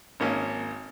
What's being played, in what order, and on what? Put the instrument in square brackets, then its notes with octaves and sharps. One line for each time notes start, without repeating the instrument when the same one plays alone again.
[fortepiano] G#1 A#3 C#4